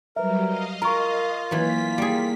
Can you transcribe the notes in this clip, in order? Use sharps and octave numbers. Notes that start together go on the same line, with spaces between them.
F#3 G3 A#4 B4 E5
D#5 F5
F4 A#4 A#5 C#6
E3 F#3 A#3 B6
G3 G#4